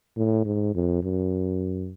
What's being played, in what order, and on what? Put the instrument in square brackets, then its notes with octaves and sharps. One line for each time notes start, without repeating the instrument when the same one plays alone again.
[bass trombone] A2
G#2
F2
F#2